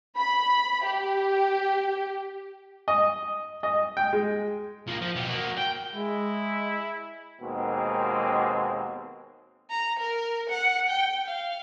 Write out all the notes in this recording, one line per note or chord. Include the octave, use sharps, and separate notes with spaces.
B5
G4
D#5
D#5
G5
G#3
F3 A#3
F3
B2 G4
A#3 F#4
G5
G#3 E4
D#2 B2 G#3 A#3 C4
A#5
A#4
F#5
G5
F5